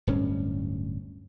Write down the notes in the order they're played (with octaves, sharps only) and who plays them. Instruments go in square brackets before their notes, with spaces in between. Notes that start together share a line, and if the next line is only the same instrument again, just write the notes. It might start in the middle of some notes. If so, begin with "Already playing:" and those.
[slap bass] D1 G2 C#4